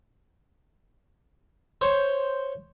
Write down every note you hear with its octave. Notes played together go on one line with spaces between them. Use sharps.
C5 C#5